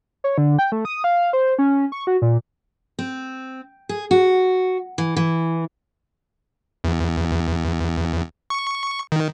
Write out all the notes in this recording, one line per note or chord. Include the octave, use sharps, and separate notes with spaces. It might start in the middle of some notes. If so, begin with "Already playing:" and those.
C#5
D3
G5
A3
D#6
F5
C5
C#4
C#6
F#4
A#2
C4
G#4
F#4
E3
E3
E2
E2
C#6
D#3